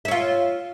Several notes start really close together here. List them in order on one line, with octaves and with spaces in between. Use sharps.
E5 C#5 F4